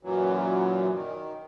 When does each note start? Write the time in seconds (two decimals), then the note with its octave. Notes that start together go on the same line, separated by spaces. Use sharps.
0.03 F#2 A#2 E3 F#3
0.93 D#3